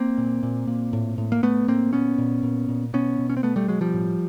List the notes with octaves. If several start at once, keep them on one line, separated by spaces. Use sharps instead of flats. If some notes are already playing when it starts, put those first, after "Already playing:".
Already playing: A#3 C4
A#2
A#2
A#2
A2
A2
A#3
A2 A3 B3
A2 A#3 C4
A#2 B3 C#4
A#2
A#2
A#2
B2 B3 C#4
B2
C#4
C4
B2 A3 B3
G3 A3
B2 F#3 G#3
F3 G3
A2